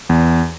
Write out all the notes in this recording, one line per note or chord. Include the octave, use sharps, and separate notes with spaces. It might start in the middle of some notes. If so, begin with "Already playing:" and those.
E2